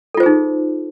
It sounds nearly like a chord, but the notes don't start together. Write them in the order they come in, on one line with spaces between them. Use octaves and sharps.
A4 F4 C5 G#4 D#4